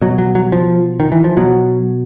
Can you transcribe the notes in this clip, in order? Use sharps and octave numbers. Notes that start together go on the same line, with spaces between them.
B2 F#3
F#3
F#3
F3
D#3
E3
F3
B2 F#3